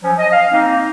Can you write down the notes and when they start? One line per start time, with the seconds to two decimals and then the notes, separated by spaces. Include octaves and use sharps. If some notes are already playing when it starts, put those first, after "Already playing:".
0.02 F3 F#3 C#4
0.18 D#5
0.32 F5
0.52 A#3 C4 D#4